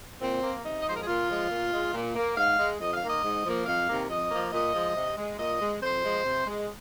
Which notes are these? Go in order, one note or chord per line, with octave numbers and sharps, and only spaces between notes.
A#2 C4
A#3
C3 D#4
D#5
F3 G#3 A#4 C5
G#4
A#2 F4
F3 G#3
A#2
G#3
A#2
A#3
G#2 F5
G#3
F2 D#5
F5
D#3 A#3 D#5
G#2
F3 A#3
F2 F5
C3 D#3 A#3
F2 D#5
F3 A#3
A#2 D#5
F3 G#3
C3
G#3
A#2 D#5
G#3
F2 C5
F3 G#3
C3
G#3